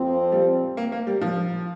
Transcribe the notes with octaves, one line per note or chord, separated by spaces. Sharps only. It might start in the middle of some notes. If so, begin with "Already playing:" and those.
Already playing: F2 F3 C4
G3
A#3
A#3
G3
F3